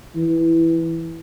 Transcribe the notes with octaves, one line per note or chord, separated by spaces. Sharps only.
E3